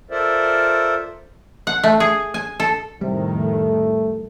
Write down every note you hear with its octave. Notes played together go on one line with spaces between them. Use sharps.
F4 A4 A#4 C5 D5 E5
F#5
A3
G#4
G#5
A4
F2 A2 C3 D#3 G3
A3